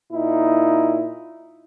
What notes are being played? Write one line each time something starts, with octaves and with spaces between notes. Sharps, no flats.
A#2 D#4 E4